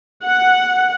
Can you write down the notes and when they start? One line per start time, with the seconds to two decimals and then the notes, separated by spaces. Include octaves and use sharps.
0.22 F#5